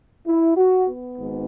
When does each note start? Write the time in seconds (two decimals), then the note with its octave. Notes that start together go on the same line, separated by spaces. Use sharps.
0.26 E4
0.56 F#4
0.86 B3
1.17 G#1 G#2